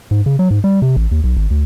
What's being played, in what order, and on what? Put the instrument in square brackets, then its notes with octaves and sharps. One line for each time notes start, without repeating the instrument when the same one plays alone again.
[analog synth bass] G#2
C#3
F#3
G#2
G3
C3
A1
D#2
B1
G#1
D2